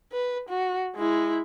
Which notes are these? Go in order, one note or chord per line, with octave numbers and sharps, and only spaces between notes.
B4
F#4
G#3 E4